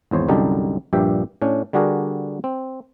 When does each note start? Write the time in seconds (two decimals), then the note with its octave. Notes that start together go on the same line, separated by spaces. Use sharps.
0.11 G#1 E2 C5 C#5
0.28 C2 F#2 D3 D#4 G4 A5
0.93 A#1 G2 A#2 G4 E5 G5
1.42 A2 C#4 D4
1.73 D3 G3 D4 F#4 G#4 A#4
2.44 C4